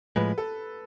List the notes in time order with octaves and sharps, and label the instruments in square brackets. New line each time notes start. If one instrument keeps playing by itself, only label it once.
[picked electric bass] A2 F3 G#3 [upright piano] B4
[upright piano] A4